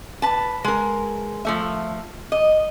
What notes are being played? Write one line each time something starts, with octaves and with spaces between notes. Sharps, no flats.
B4 A5
G#3 A#4
F3 A3 E5
D#5